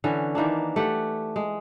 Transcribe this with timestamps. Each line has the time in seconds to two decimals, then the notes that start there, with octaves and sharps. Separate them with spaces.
0.04 D3 E3 C#4
0.35 D#3 E3 A#3 D4
0.76 A3 G4 F#5
1.36 G#3